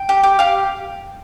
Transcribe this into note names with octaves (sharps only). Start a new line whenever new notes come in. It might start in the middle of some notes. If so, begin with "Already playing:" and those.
Already playing: G5
G4
G4
G4 F5